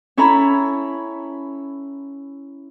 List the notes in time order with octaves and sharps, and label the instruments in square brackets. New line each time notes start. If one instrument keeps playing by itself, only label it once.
[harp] C#4 E4 A4 A#5 B5